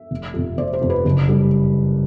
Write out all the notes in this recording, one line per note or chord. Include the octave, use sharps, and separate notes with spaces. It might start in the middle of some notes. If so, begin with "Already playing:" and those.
Already playing: E5
F1
F2 C3
F1 C5 D5
C5
F2 C3
B4
F#1
G3